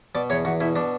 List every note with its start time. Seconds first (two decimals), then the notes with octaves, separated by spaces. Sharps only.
0.15 B2 D5
0.30 E2 C#5
0.45 E2 F#4
0.61 B2 E4
0.76 B2 D4